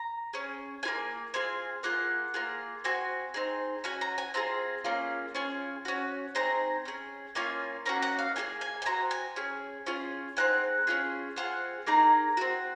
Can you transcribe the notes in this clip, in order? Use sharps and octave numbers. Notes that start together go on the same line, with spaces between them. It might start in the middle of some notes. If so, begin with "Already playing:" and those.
Already playing: A#5
C#4 G#4
A#3 F4 G#4 G#5
C4 F4 G#4 G#5
A#3 F4 G#4 F#5
A#3 F4 G#4
C4 F#4 G#5
C4 D#4 G#4
C#4 F#4 G#5
A#5
G#5
C4 F4 G#4 A#5
A#3 C#4 F4 G#4
C#4 F4 G#4 G#5
C#4 F#4
C4 D#4 G#4 A#5
C#4 G#4
A#3 C#4 F4 G#5
A#3 C#4 F#4 A#5
F#5
F5
A#3 F4 G#4 G#5
G#5
G#5
C4 F#4 A#5
G#5
C#4 G#4
C#4 F4 G#4
C4 D#4 G#4 F#5
C#4 F4 G#4
C4 F4 G#4 F#5
A#3 D#4 G#4 A#5
C4 F#4